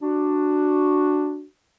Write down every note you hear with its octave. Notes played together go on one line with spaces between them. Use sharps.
D4 F#4